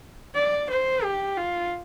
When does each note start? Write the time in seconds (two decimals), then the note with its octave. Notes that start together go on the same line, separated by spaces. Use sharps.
0.35 D5
0.69 C5
1.03 G4
1.37 F4